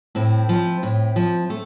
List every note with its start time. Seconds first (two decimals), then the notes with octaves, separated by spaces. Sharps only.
0.15 A2 C4 E4
0.49 F3
0.83 A2
1.16 F3
1.50 A3